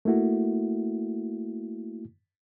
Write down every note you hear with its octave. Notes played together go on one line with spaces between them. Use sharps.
A3 A#3 E4 F#4